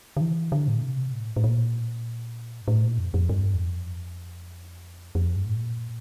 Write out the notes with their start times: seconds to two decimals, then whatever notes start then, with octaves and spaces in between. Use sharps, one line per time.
0.17 D3
0.21 E3
0.52 D3
0.68 A2
0.75 A#2
0.83 C3
1.13 A2
1.36 A2
1.44 A#2
2.62 G2
2.68 A2
2.84 A#2
2.98 F2
3.14 F2
3.29 G2
3.54 E2
3.60 F2
5.15 F2
5.36 G2
5.46 A2
5.56 A#2